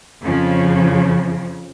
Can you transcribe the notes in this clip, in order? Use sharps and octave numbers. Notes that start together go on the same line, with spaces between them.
F2 C#3 F3